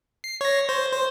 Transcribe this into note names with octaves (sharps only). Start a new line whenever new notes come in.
C7
C#5 A#6
C5
C5